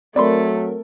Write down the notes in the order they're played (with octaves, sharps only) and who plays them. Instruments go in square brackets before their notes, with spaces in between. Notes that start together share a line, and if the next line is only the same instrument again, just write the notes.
[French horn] F#3 [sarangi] A3 [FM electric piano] C4 A#4 [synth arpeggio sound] D5 B5 C6